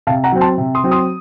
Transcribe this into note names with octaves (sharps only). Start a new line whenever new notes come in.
C3 F5 A5
F#5 A#5
F#3 C4
A5 C6
C3
C6 D#6
F#3 C4
C6 D#6